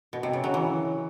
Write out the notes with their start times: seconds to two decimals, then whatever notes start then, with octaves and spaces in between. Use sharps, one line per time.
0.13 B2
0.23 C3
0.33 C#3
0.44 F#3
0.54 E3